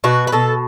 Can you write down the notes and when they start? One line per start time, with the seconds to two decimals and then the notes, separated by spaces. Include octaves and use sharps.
0.04 B2 F#4
0.27 B4
0.32 B2 A4